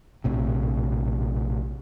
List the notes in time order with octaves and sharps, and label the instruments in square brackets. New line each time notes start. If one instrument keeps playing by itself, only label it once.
[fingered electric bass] A#1 A2 C3